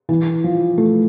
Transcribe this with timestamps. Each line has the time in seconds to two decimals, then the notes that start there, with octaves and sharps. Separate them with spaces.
0.09 E3
0.44 F3
0.78 A3